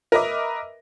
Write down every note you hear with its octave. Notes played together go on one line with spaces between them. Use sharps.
A#4 B4 D#5 E5 D6